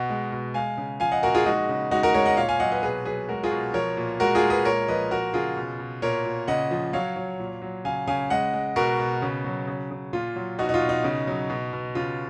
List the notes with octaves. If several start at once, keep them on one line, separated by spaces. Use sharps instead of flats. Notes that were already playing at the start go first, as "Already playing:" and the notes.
Already playing: B2 D#5 F#5
G#3
B2
G#3 F5 G#5
C#3
F3 F5 G#5
D#5 F#5
A#2 F#4 A#4
F4 G#4
G#3 D#4 F#4
C#3
G#3 D#4 F#4
F#4 A#4
G#3 A#4 C#5
D#5 F#5
A#2 C#5 F5
F5 G#5
F#3 D#5 F#5
B4 D#5
B2 G#4 B4
F#3 G#4 B4
G#3 F#4 A#4
F4 G#4
B2
F3 A#4 C#5
A#2
G#3 F#4 A#4
F4 G#4
G#3
G#4 B4
A#2 A#4 C#5
F3 B4 D#5
F3 F#4 A#4
C#3 F4 G#4
B2
B2
A#2 A#4 C#5
A#2
C#3 D#5 F#5
F3
F#3 C#5 F5
F#3
A#2
F#3
C#3 F5 G#5
C#3 F5 G#5
G#3 D#5 F#5
G#3
B2 F#4 A#4
B2
C#3
F#3
C#3
C#3
A#2 F4
F#3
B2 D#4 F#4
D#4
F4
B2
D#4
C#3
F#3
B2
B2
C#3 F4